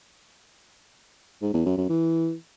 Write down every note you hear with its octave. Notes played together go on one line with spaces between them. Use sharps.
G#2
E2
F#2
F#2
E3